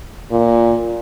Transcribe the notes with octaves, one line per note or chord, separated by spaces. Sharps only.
A#2